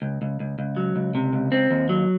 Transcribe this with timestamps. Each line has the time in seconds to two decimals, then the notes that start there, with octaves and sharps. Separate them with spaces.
0.02 C#2
0.22 C#2
0.40 C#2
0.59 C#2
0.77 F#3
0.96 C#2
1.15 C3
1.33 C#2
1.52 C4
1.71 D#2
1.89 F#3